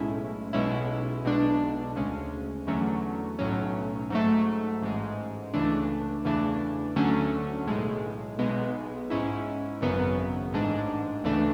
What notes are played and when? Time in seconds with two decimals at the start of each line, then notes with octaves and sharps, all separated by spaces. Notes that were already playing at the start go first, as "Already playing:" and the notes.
Already playing: B1 A2 G#3 C#4 E4
0.53 B1 B2 G#3 C#4 E4
1.25 B1 B2 G#3 D4
1.96 D2 C#3 G#3 C#4
2.67 E2 D3 F#3 A3 C#4
3.39 B1 A2 F#3 C#4
4.10 G#2 F#3 A3
4.82 A1 G#2 G#3
5.54 C#2 C#3 E3 A3 D4
6.25 E2 C#3 E3 A3 D4
6.96 D2 D3 F#3 A3 C#4
7.67 B1 A2 G#3
8.39 B1 B2 G#3 B3
9.10 G#2 G#3 C#4 E4
9.81 G#1 F#2 C#3 F#3 B3
10.53 A1 G#2 G#3 D4
11.24 D2 C#3 E3 A3 D4